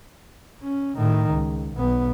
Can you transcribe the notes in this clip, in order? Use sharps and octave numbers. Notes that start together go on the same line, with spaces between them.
C#4
A2 D#3
C#2
B1 B3